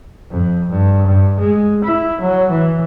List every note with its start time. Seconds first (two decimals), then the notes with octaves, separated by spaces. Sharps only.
0.31 F2
0.70 G2
1.07 G2
1.40 G#3
1.84 E4
2.21 F#3
2.51 E3